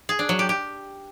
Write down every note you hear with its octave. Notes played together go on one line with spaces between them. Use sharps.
G#4
D4
F#3
G4
G4